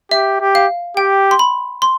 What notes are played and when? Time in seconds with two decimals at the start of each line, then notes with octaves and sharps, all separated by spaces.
0.11 G4 E5
0.41 G4
0.55 F5
0.97 G4 G5
1.31 C6
1.39 B5
1.82 C6